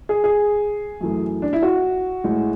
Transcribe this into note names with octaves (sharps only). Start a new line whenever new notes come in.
G#4
G#4
F#2 E3 A3
D4
E4
F#4
A2 G#3